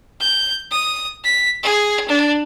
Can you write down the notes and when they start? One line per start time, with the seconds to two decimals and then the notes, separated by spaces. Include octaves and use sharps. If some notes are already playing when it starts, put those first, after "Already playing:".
0.21 G6
0.71 D#6
1.24 B6
1.63 G#4
2.08 D4